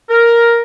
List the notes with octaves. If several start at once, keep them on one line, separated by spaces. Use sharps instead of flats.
A#4